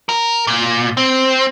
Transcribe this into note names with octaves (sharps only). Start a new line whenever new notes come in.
A#4
A#2
C4